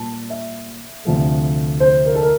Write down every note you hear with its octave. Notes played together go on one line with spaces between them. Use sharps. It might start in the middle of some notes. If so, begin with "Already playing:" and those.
Already playing: A#2 G3 A#3 A5
E5
D2 C3 F3 A3
C5
A#4
A4
A#4